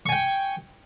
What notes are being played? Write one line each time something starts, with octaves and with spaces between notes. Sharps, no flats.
G5 G#5 C#6